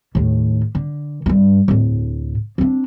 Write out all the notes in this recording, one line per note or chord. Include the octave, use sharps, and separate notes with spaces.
D#2 A2
D3
G2 A#3
D1 A2
C4 D4